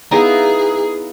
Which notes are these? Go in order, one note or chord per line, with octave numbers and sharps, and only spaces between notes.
B3 D#4 E4 G#4 E5 F5 A#5